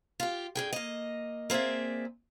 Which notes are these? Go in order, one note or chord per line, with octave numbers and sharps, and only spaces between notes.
F4 G4
G2 G#4 G5
A#3 D#5
A#3 C4 G#4 D5 E5